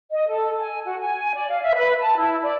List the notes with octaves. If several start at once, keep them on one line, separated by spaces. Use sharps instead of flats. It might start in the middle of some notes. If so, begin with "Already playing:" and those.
D#5
A4
G#5
F#4
G#5
D5
F5
E5
B4
A5
E4
D5